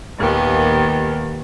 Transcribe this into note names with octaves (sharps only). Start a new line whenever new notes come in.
D#2 A#2 D#3 B3 G4